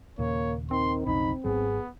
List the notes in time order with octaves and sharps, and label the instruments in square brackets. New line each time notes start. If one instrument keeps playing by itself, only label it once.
[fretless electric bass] D#2 A#2 C#3 [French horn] A#3 [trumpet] C#5
[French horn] D#3 [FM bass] C4 [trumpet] C6
[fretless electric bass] B1 F2 C#3 [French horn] D#4 [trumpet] B5
[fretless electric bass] G#1 G#2 F#3 [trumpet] B3 [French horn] G#4